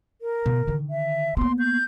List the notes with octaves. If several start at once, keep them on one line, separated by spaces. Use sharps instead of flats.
A#4
B2
D3 D#3
E5
A#3 B3 C6
G6